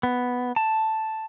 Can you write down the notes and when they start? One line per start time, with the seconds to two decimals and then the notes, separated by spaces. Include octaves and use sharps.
0.03 B3
0.56 A5